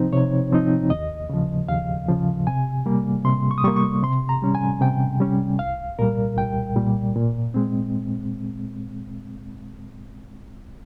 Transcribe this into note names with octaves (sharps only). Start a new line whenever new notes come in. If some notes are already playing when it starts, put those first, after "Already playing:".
Already playing: C3 F3 C4 D#4 C5
C3 C#5
F3 C4 D#4
D#2 D#5
C#3 F3
D#2 F5
C#3 F3
C3 G#5
G3 A#3
C3 C6
C#6
D#6
G3 A#3 C#6
C#6
C3 C6
A#5
G3 C#4
G#5
C3 G5
G3 C#4
C2 F5
A#2 G3 A#4
C2 G5
A#2 G3
A#2
G#3 C4